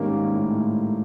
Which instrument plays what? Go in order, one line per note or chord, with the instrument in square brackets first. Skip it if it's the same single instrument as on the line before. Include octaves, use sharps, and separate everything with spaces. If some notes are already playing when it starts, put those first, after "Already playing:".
Already playing: [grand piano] G#2 [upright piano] D#3 G3 A#3 C#4
[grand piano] A2